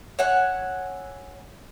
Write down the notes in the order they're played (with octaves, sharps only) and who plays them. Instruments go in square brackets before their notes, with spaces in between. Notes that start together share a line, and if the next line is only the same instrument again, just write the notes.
[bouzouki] C#5 E5 F#5 G#5